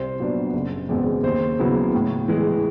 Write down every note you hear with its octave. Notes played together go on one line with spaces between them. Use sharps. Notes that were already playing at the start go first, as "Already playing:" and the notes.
Already playing: C2 C5
A#2 F#3 B3 D4
F#1
E2 B2 G#3 C4
D#2 C5
C#3 F#3 B3 E4
A2
E3 G#3